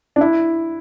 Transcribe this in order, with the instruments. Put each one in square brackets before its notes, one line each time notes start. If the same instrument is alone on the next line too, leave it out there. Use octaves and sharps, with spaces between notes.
[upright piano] D4
E4